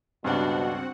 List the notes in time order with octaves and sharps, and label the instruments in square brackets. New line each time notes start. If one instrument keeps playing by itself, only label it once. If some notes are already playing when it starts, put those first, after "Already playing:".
[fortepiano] C#2 G2 [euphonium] B2 [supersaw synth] C4 F#4 F#5 [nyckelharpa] D4